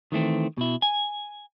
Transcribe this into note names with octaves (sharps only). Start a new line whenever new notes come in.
D#3 E3 A3 C4
B2 E4
G#5